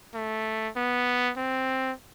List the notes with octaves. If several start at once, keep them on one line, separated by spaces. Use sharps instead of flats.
A3
B3
C4